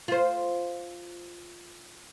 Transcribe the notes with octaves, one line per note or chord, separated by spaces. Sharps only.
F4 C5